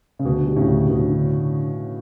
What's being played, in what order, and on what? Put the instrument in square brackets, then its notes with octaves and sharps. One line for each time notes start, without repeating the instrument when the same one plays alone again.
[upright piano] C#3
[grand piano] D2 [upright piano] B2 D3
[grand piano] G3
[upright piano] A2 C#3
[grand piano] D2
[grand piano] D2 [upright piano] B2 D3
[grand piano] D3